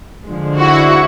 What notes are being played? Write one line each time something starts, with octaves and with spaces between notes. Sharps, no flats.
D3 F3 G#3
E4 F#4